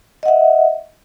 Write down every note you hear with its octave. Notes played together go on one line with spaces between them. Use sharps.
D#5 E5 F#5